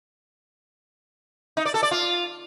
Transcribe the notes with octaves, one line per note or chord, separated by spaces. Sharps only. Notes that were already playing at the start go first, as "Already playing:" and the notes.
D#4
D5
A4
D5
F4